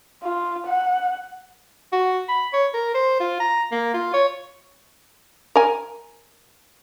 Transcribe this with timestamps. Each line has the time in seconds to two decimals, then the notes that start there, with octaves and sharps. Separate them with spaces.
0.23 F4
0.67 F#5
1.92 F#4
2.28 B5
2.53 C#5
2.74 A#4
2.94 C5
3.20 F4
3.40 A#5
3.72 A#3
3.94 F4
4.14 C#5
5.56 A#4 G#5